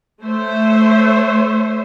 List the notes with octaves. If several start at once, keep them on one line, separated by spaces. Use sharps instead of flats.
A3 C5 C#5 E5